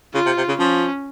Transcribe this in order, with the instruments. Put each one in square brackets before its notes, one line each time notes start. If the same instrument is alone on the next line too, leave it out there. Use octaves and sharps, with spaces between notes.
[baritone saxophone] C#3 [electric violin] F4
[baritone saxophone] C3
C3
C#3
[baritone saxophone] F3 [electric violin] C#4